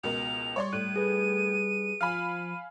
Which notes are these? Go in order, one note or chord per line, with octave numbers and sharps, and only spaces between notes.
C#2 B2 A#4 F7
G3 C#5 D5 C6
A2 F#6 D#7
G#4 B4
F3 F5 G#5 B5 F6